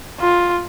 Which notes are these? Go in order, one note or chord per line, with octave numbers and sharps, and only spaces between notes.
F4